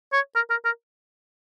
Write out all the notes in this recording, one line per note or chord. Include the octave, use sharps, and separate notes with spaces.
C#5
A#4
A#4
A#4